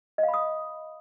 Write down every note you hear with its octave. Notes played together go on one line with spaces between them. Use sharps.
D#5
F5
B5
D#6